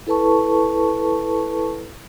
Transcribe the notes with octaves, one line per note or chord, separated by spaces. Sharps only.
E4 A4 B4 A5 C#6